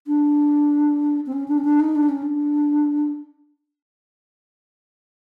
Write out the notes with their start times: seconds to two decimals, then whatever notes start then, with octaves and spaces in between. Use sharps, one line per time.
0.07 D4
1.26 C4
1.33 C#4
1.48 D4
1.58 C#4
1.64 D4
1.80 D#4
1.95 D4
2.09 C#4
2.22 D4